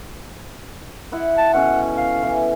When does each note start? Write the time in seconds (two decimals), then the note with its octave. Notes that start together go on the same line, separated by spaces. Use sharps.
1.12 E4 D#5 F#5
1.38 A5
1.54 B2 C#4 A4 F#5
1.97 F5
2.23 E3